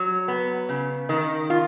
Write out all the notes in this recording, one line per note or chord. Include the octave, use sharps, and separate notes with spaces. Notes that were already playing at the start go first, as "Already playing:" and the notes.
Already playing: F#3
B3
C#3
D#3
F4